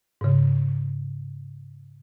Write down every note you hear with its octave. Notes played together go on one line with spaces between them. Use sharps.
G#2 C#3